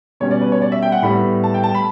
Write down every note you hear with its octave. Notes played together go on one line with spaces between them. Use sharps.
B2 G3 C#4 C#5
D5
B4
C#5
D5
E5
G5
F#5
A2 G3 B3 B5
A5
G5
A5
B5